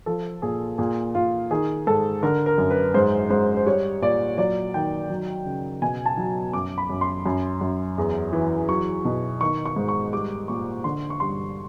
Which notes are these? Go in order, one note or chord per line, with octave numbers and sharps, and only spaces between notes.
F3 A4
A#2 G#4
A#2 G#4
A#2 F4
D#3 G#4
G#2 A4
D3 A#4
A#4
F#2
B4
G#2 C5
G#2 C5
C5
G3 C#5
A#2 D5
F#3 D5
D#3 G5
F#3
C#3
B2 G#5
A5
F#3
F#2 D6
B5
F#2
C6
F#2
F#2
E2
E3
F#3 C#6
B2
D#3 C#6
C#6
G#2
C#6
G3 D6
A#2 C#6
D3 C6
C#6
G2 C6